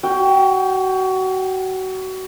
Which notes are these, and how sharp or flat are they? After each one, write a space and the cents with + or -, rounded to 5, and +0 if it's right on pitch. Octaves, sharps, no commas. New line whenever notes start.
F#4 +25 G5 +0